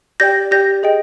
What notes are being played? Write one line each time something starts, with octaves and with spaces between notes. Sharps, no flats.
G4 D5 G5 G6 A#6
G4 D5 G5 G6 A#6
G#4 D#5 G5